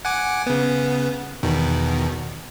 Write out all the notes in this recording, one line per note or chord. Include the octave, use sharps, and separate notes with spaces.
F#5 G#5 D6
C#3 B3
E2 B2 D#3